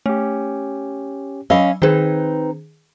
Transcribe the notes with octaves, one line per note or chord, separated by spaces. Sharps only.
A3 C#4 G4
F#3 C#4 D#5 F5 B5 E6
D#3 C4 D#4 G#4 B4 G#6